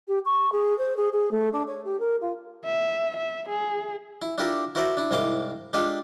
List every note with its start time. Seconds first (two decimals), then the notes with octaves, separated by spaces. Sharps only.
0.08 G4
0.25 C#6
0.52 G#4
0.78 C5
0.97 G#4
1.13 G#4
1.31 A3
1.52 D4
1.67 C#5
1.85 G4
2.00 A#4
2.21 F4
2.65 E5
3.17 E5
3.49 G#4
4.22 E4
4.38 D4 E4 F4 G4 A4 A#4
4.75 E4 F#4 A#4 C5 D5 E5
4.97 D4 E4
5.11 C2 G#2 E4 F5 C6 D6
5.73 G#3 D4 F4 G4 A4 F5